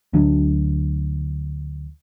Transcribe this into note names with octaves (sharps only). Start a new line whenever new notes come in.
D2 D3 F#3 D4